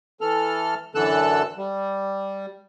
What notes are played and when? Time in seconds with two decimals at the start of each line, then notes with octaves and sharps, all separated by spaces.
0.21 E3 A4 F6
0.95 F#2 D3 E3 A4 E6 F#6
1.57 G3